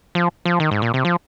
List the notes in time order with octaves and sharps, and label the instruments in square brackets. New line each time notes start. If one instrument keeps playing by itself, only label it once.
[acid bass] F3
F3
D#3
G#2
A#2
C3
F3